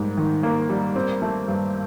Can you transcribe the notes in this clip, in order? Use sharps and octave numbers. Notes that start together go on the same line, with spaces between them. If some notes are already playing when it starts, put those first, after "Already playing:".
Already playing: G#2 G3 A#3
D#3
A#3
G3
C4
A3
G2